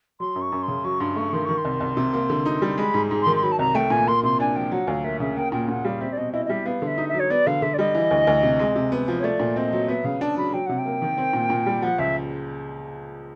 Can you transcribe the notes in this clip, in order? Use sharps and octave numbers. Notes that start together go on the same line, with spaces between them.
F#3 C6
F#2
C#6
F#2
C6
C#3
F#3 C#6
G2 C6
A3 C#6
D#3 C6
D#3 C#6
C6
C2
C2
C3
A#3
D3
D#4
G3
G#3 B5
G#2
G#2
C6
D#3
C6
F#3 B5
A5
C2 A#5
A3 G5
A#2 G#5
A#3 C6
C3 C6
D4 G#5
F3 G5
F#3 F#5
D2 F5
A#3 E5
C#3 E5
A#3 G5
A#2 G5
A#2 F#5
G3 F5
C4 E5
D5
B2 D#5
E4 D#5
D#5
G3 E5
B3 F5
D3 E5
D#4
E5
F#3
C#5
B3 D5
D3 F5
D3 E5
D5
G3 D#5
E3
D2
D2
C3
G#3
C3
B3
F3
C#5
A3 D5
A#2
C4 D#5
F#3
B3 E5
C#3 F5
D4 A5
F#3 B5
F#3 G5
C3 F#5
G5
A#3
D#3
C4
A#2
A#2
G3
F3 F#5
C#2 E5